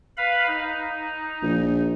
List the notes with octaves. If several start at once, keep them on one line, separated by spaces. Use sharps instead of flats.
B4 F5 B5
D#4
A#1